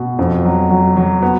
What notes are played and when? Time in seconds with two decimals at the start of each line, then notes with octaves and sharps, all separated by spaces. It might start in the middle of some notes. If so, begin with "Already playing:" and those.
Already playing: B2
0.19 F2
0.44 F#3
0.70 F#3
0.97 F#3
1.22 B3